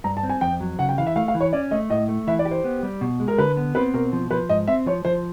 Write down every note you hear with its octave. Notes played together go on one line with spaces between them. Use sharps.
G2 A#5
A5
C4
G#5
F2 G5
F#3
C#3 F#5
G5
E3 F5
E5
A3 F5
F5
E3
C#5
C#4 D5
A3 D#5
A2 D#5
A3
E3 E5
D5
G4
C5
B3
G3
B2
G#3
A#4
D3 B4
B3
C4 B4
B2 A#4
F3
F3 B4
G#2 D#5
C4 E5
F3 C#5
F3 C5